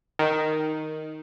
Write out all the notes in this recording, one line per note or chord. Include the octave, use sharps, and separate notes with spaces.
D#3